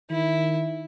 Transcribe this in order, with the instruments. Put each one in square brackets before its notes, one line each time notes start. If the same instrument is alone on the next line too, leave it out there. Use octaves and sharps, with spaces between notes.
[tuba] D#3 [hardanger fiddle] E4